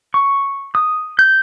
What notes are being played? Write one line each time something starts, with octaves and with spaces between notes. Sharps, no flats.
C#6
D#6
G6